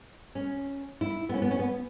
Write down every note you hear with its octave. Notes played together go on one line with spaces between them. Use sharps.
C#4
E4
B3
C#4
B3
C#4
B3